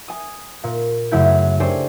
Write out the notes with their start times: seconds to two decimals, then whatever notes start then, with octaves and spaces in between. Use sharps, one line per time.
0.08 G#5 D#6
0.64 A#2
1.11 F#2 C#3 A3 E4 G6 G#6
1.60 D4 G4 A4 C5 C#5 G#5